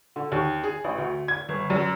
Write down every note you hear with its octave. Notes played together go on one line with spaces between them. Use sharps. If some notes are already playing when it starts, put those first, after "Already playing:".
D3
D#2
G#4
A1
D2
G#6
G1
F#2